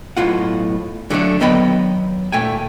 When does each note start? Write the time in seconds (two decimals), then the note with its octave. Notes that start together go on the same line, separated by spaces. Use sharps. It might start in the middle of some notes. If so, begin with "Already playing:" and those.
0.17 B1 A2 F4 F#5
1.10 D3 F#3 G#3 A3 D4
1.40 D#2 F#3 B3 D#5 G5 B5
2.32 A#2 A3 G5 G#5